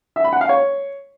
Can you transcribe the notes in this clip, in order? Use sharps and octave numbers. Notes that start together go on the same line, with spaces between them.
E5
B5
F#5
F5
C#5